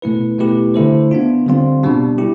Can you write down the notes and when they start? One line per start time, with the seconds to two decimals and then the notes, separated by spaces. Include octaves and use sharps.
0.02 B2 A3 E4 B4
0.38 B2 A3 E4 G4 B4
0.74 D3 A3 E4 A4 C5
1.11 B3 D4 F4
1.47 D3 G3 C4 F4
1.83 B2 G3 D4
2.18 E4 G4